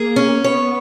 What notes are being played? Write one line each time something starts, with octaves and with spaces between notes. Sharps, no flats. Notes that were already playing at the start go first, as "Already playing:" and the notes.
Already playing: A#3 G#4
C#4
B3 C#5